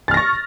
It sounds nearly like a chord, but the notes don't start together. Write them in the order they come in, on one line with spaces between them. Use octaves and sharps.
A6 F6 A#6 C#6